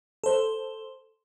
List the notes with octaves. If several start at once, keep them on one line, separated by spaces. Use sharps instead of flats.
A4 C5